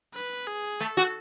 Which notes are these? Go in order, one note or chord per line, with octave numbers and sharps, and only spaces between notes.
B4
G#4
A3 A4
F#4